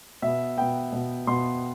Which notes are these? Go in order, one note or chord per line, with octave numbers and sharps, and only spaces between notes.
B2 B3 E5
B2 B3 G5
B2 B3
B2 B3 C6